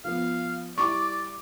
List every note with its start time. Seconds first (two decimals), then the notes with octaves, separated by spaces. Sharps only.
0.05 F3 B3 F5
0.78 G3 E4 D5 C#6 D6